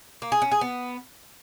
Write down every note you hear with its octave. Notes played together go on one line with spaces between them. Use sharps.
A#3
G#4
C#4
G#4
B3